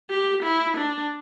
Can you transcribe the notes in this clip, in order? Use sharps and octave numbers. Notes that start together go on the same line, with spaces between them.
G4
E4
D4